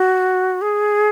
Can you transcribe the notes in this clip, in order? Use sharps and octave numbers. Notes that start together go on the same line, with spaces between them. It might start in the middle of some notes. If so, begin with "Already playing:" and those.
Already playing: F#4
G#4